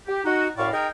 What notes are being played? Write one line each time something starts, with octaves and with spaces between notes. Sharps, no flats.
G4
D#4 F#4
F#2 A2 D5 F5 C#6
D#4 G#4 A#4 G5